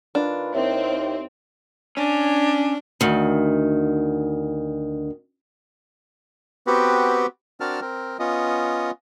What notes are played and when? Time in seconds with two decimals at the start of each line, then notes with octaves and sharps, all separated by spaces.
0.15 D#3 D4 F4 B4
0.54 D#2 C4 E4 C#5 E5
1.97 C#4 D4
3.01 D2 D#3
6.67 B3 C4 F#4 G4 B4
7.60 C4 D4 F#4 A#4 A5 F6
7.81 C4 A#4
8.19 B3 C#4 F4 D#5